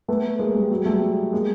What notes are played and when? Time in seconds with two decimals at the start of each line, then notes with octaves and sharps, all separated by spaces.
0.08 A3 B3
0.39 G#3 A#3
0.55 G3 A3
0.70 F#3 G#3
0.86 G3 A3
1.33 G#3 A#3